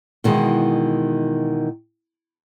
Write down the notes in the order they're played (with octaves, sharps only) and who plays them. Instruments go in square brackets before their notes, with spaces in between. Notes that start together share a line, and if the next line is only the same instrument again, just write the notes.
[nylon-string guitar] B2 D#3 E3 G#3